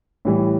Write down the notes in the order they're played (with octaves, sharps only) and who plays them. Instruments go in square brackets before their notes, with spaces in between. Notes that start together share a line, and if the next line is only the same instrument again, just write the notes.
[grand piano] A2 E3 G3